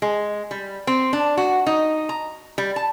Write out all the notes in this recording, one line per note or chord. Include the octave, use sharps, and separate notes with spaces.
G#3
G3
C4
D4
F#4
D#4
A#5
G3
A5